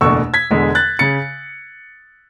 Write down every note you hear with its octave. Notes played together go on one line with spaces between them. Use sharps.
F#1 E2 B2 A3 D4 C#6 E6
G#6 B6
E1 E2 D3 G#3
F#6 A6
C#3 A6 C#7